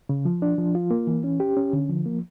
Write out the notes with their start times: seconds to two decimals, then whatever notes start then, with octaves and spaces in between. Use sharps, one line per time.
0.09 C#3
0.25 F3
0.42 D4
0.58 F3
0.75 F4
0.91 A#3
1.07 E3
1.24 C#4
1.40 G4
1.57 C#4
1.73 D3
1.89 F3
2.06 A#3